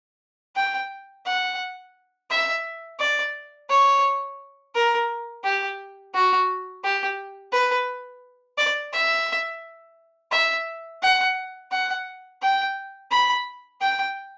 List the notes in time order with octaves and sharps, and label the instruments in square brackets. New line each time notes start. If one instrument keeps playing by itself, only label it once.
[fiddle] G5
F#5
E5
D5
C#5
A#4
G4
F#4
G4
B4
D5
E5
E5
F#5
F#5
G5
B5
G5